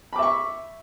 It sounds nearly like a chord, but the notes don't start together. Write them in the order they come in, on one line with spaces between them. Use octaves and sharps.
B5 D6 E5 C#6